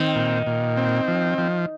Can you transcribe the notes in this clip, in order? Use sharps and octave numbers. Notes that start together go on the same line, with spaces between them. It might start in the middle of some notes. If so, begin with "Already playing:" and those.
Already playing: D#3 C4
A#2
A#2
C4
F3
F3